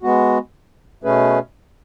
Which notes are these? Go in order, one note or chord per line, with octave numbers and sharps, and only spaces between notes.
G#3 B3 F#4
B2 A3 C#4 G#4 B4